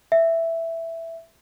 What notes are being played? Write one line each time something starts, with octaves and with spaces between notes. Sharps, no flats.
E5